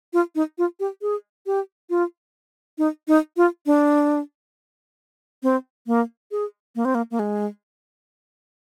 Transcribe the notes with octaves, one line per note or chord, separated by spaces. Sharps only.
F4
D#4
F4
G4
G#4
G4
F4
D#4
D#4
F4
D4
C4
A#3
G#4
A#3
C4
A#3
A#3
G#3